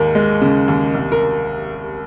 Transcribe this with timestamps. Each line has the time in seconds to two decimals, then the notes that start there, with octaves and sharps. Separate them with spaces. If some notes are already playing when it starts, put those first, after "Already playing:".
Already playing: D#2 G#2 A#3 A#4
0.15 G#3
0.41 C#3
0.68 D#2
0.94 C2
1.12 A#4